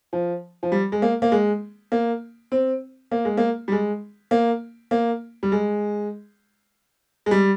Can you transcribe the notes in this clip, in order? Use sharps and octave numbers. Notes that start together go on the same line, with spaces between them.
F3
F3
G3
G#3
A#3
A#3
G#3
A#3
C4
A#3
G#3
A#3
G3
G#3
A#3
A#3
G3
G#3
G#3
G3